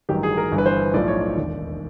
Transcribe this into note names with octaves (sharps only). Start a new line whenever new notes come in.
A1 G2 D#3 F#3 G4
G#4
A#4
G1 G2 E3
B4
C5
B1 A2 F3 D5
C#5
D5
E1 D#2 D#3